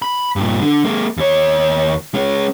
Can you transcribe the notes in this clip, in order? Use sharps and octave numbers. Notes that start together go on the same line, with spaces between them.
B5
G2 A#2
D3
G#3 A#3
D#2 C#5
G#3 C#4